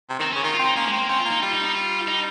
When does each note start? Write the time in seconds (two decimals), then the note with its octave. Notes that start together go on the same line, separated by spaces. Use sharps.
0.10 C3
0.19 D#3 C4
0.33 C#3 C#4
0.43 D#3 F4
0.54 F4
0.59 C4
0.65 D#4
0.76 A#3 C#4
0.88 G#3
0.92 C4
0.98 A#3
1.09 C4 C#4
1.20 F4
1.25 A#3
1.31 D#4
1.42 G3 F4
1.53 D#4
1.64 D#4
1.74 F4
2.08 D#4